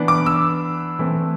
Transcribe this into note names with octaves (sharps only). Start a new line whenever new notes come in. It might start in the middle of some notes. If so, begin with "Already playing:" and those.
Already playing: E3 B3 D4
D6
E6
E3 A3 C4